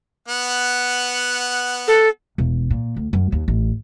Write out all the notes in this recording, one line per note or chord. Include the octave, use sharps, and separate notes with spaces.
B3 F#5
A4
E1
A#2
D2
F#2
D#2
A1